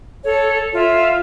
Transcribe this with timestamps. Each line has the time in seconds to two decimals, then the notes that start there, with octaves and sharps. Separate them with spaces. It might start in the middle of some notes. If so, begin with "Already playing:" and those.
0.25 A4 C#5
0.74 F4 E5 F5